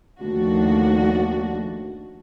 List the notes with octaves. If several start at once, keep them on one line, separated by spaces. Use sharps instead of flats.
D#2 F3 A3 D4 F#4